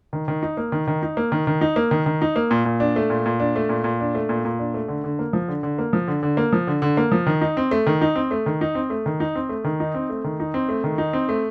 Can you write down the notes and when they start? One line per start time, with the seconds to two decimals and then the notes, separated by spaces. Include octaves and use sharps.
0.13 D#3
0.28 D#3
0.43 D#4
0.57 A#3
0.72 D#3
0.87 D#3
1.02 D#4
1.17 A#3
1.32 D#3
1.47 D#3
1.61 D#4
1.76 A#3
1.91 D#3
2.06 D#3
2.22 D#4
2.36 A#3
2.51 A#2
2.65 A#2
2.80 D4
2.96 A3
3.10 A#2
3.26 A#2
3.40 D4
3.56 A3
3.69 A#2
3.84 A#2
4.00 D4
4.15 A3
4.29 A#2
4.45 A#2
4.59 D4
4.74 A3
4.88 D3
5.04 D3
5.19 A#3
5.33 F3
5.48 D3
5.63 D3
5.78 A#3
5.93 F3
6.08 D3
6.23 D3
6.37 A#3
6.53 F3
6.67 D3
6.82 D3
6.97 A#3
7.12 F3
7.26 D#3
7.41 D#4
7.57 C4
7.71 A3
7.87 D#3
8.01 D#4
8.15 C4
8.31 A3
8.46 D#3
8.61 D#4
8.75 C4
8.90 A3
9.06 D#3
9.20 D#4
9.35 C4
9.49 A3
9.64 D#3
9.80 D#4
9.94 C4
10.10 A3
10.24 D#3
10.40 D#4
10.54 C4
10.69 A3
10.84 D#3
10.98 D#4
11.13 C4
11.29 A3